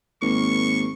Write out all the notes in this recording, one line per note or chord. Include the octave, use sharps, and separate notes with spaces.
G#1 A#3 C#6